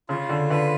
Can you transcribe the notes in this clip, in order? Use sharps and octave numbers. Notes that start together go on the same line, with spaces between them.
C#3 F4
D3
D3 B4